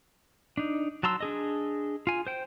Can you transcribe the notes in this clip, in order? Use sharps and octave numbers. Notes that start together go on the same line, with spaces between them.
D4 D#4
F#3 A5 A#5 C6 E6
D4 G#4 D#5
F4 G#5
C5 G5